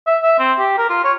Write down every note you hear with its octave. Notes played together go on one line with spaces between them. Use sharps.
E5
E5
C4
G4
A#4
F4
C#5